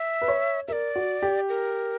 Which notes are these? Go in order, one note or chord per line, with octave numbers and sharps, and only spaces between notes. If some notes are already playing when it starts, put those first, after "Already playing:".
Already playing: E5
B4
C#5
A#4 D5 E5
F#4
G4
A#4